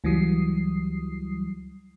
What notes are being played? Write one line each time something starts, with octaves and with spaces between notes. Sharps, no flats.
C#2 E3 F#3 G3 D#6 C7